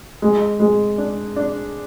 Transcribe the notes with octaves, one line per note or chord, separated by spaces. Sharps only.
G#3
G#3
D4
D4